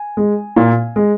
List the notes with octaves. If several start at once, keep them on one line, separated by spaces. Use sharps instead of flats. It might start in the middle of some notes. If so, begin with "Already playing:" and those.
Already playing: G#5
G#3
A#2
G#3